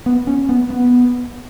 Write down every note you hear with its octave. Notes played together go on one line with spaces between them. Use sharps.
B3
C#4
B3
B3